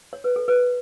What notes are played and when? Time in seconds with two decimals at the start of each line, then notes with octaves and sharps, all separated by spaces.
0.13 C#5
0.24 B4
0.36 A4
0.48 B4